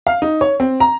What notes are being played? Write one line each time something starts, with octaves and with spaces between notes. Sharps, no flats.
F5
D#4
C#5
C4
A#5